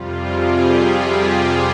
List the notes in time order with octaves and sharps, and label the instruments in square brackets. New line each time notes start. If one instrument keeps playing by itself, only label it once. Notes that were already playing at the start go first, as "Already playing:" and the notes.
Already playing: [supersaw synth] F2 C3 G3 F4
G#4
G4